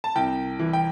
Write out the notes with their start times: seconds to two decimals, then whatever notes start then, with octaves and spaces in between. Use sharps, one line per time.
0.04 A5
0.16 C2 G5
0.59 E3
0.73 G5